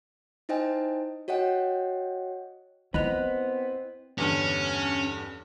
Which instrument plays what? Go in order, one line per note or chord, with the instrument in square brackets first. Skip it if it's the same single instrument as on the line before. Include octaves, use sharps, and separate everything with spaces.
[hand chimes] D#4 E4 C5 D#5 G5 G#5
F#4 C#5 D#5 F#5 G5
[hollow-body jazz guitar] B3 B5 [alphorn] C4 [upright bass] E4 [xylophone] D#5 F#6 F7
[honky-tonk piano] E2 G2 D3 [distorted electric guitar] C#4